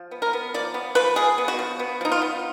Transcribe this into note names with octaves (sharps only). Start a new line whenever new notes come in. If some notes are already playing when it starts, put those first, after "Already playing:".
Already playing: F3
B3
A#4
B3
F3 D5
B3
F3 B4
F3 G#4
B3
F#4
F3
B3
F3 D#4
F4
B3